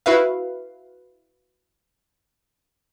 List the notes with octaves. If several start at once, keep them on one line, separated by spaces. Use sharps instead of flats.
E4 F#4 B4 E5 F5